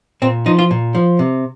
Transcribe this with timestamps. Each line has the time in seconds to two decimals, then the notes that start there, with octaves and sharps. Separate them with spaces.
0.22 A#2 C4
0.46 F3 D#4
0.59 F4
0.71 A#2
0.95 F3
1.19 C3